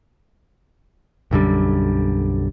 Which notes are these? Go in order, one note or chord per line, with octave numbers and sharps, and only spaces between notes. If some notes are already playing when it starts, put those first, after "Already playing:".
B1 F#2 D3 G3